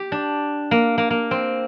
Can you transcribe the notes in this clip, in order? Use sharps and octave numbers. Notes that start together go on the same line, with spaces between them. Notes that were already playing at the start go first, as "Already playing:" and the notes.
Already playing: G4
D4
A#3
A#3
A#3
C4